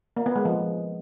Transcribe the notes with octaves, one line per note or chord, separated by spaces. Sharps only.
A#3
B3
G#3
F3